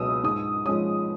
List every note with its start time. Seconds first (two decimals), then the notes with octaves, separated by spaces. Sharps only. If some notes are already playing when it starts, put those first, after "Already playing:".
Already playing: C#2 B2 F#3 D#6 E6
0.23 G#2 D#6
0.66 F3 G#3 C#4 D#6